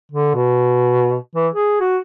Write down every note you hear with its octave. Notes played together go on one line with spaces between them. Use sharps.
D3
B2
E3
G#4
F#4